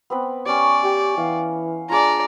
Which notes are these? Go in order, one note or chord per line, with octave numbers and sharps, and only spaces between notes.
B3 C4 B4
C#4 G4 D5
G4 G5
E3 F5 F#5
G#3 D4 F4 D5 A#5